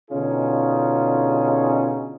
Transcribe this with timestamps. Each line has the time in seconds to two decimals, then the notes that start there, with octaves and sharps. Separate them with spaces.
0.10 B2 D3 C#4 D#4 F4 G#4